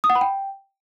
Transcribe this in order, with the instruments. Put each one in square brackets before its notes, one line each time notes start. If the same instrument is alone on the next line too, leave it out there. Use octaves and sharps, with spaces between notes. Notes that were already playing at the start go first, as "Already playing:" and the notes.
[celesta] D#6
F#5
B5
G5